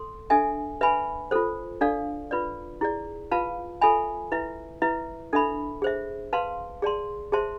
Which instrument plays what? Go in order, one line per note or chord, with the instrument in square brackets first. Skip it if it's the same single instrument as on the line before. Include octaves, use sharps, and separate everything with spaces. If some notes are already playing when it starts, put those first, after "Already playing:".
Already playing: [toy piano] A4 C6
D4 A4 E5 G#5
B4 E5 G#5 B5
F4 A4 C5
D4 A4 D5 F5
F4 B4 D5
E4 G#4 D5
F4 B4 F5 A5
F4 A4 E5 G#5 B5
E4 B4 E5
E4 B4 E5
D4 A4 E5 B5
G#4 C5 E5
B4 F5 A5 C6
G#4 D5 A5 C6
G#4 C5 E5 A5 C6